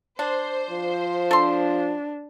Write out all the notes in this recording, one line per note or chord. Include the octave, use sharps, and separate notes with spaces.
D4 C5
F3
D4 A4 C6